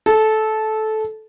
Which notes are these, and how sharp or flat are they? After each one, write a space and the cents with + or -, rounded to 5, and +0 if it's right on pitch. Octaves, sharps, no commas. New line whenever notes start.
A4 -15